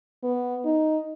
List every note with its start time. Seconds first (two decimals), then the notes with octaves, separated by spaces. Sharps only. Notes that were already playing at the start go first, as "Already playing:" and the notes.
0.23 B3
0.65 D#4